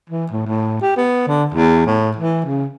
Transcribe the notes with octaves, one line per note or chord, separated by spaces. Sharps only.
E3
A2
A2
G4
B3
D3
E2
A2
E3
C#3